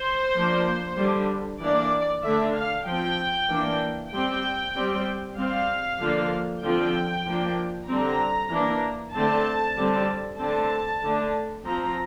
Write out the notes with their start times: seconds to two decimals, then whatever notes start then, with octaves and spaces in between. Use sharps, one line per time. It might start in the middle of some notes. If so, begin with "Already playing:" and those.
Already playing: C5
0.35 F3 A#3 D4
0.98 D3 G3 D4
1.60 E3 A#3 D4 D5
2.23 D3 A3 D4 E5
2.55 F5
2.86 F3 C4 G5
3.49 E3 A#3 D4
4.11 G3 C4 G5
4.75 G3 C4
5.37 G3 C4 F5
6.00 D3 F3 A#3 D4
6.63 D3 F3 C4 G5
7.26 F3 A#3 D4
7.88 D3 G3 C4 A#5
8.51 E3 A#3 D4
9.14 D3 A3 C4 A5
9.76 D3 G3 C4
10.39 D3 A3 C4 A5
11.03 D3 A3 D4
11.64 F3 C4 A#5